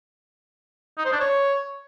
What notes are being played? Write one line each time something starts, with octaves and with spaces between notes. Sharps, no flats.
D#4
C5
D4
C#5